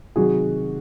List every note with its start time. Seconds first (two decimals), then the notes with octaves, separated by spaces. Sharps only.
0.16 C3 D#3 F#3 F#4 G#4